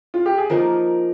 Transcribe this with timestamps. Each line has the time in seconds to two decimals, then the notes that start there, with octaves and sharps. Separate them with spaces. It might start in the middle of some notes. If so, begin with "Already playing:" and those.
0.14 F4
0.26 G4
0.38 G#4
0.50 F3 A#3 D#4 A#4